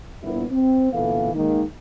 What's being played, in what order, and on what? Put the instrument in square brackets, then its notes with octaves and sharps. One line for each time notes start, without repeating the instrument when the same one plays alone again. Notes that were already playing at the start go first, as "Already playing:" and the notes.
[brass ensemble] G1 A#2 B3 E4
C4
D2 A#2 E3 B3 A4 F5
D#3 G#3 A#3